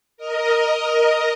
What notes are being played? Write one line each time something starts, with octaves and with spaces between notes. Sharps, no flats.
A#4 D#5